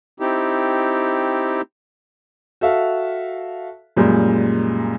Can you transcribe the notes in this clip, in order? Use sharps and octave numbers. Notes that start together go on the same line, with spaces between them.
C4 D#4 E4 G4
F#4 A4 E5 F5
F#2 A#2 G3 G#3